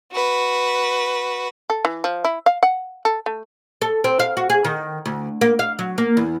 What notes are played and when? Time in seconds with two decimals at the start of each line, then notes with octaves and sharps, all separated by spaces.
0.12 F#4 B4
1.70 A4
1.85 E3
2.04 F3
2.24 E4
2.46 F5
2.63 F#5
3.05 A4
3.26 A3
3.82 A4
4.04 C4
4.20 F5
4.37 F#4
4.50 G#4
4.65 D#3
5.06 D2
5.41 A#3
5.59 F5
5.79 F#3
5.98 A#3
6.17 E2